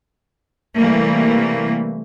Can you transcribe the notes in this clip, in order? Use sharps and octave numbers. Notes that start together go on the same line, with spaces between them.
C3 E3 G3 A3 A#3